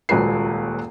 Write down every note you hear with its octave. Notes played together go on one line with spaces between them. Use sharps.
D#1 C#2 A#2 F#4 B4 C7